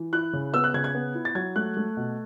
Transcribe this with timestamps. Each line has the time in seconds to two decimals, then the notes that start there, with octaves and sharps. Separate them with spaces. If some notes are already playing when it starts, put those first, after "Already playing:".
Already playing: E3
0.13 E4 F#6
0.33 C#3
0.54 B3 E6
0.64 F#6
0.74 C#3 G#6
0.84 G#6
0.95 B3
1.15 E4
1.25 A6
1.35 F#3 G#6
1.56 A3 F#6
1.77 A3
1.97 B2